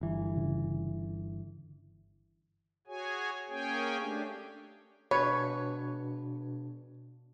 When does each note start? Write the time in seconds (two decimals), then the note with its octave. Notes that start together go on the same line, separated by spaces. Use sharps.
0.01 G1 E3
0.37 C#3
2.87 F#4 G#4 C#5 G#5
3.49 A#3 C#4 G#4 C#5 G5 G#5
3.99 A3 D4 G4
5.11 B2 D4 B4 C#5